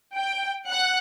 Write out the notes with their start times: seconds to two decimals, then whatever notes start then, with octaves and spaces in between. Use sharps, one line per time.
0.17 G5
0.68 F#5 F#6